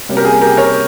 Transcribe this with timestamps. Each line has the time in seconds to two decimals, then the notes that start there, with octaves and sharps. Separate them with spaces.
0.09 C3 G3 A#3 C#4
0.17 G4 A#4
0.25 G#4
0.41 G4 A#4
0.57 A#4 C#5